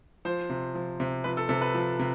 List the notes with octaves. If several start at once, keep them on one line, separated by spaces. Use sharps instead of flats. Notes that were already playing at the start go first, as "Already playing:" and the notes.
F3 C5
C3
F3
C3
F3 B4
A4
C3 A4
B4
F3
C3